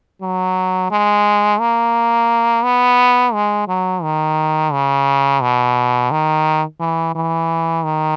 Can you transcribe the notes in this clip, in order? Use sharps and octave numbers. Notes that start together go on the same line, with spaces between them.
F#3
G#3
A#3
B3
G#3
F#3
D#3
C#3
B2
D#3
E3
E3
D#3